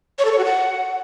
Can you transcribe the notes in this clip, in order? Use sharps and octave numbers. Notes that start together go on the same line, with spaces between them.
C#5
A4
C#5
F#4
F#5